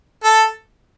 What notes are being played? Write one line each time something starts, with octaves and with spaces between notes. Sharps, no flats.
A4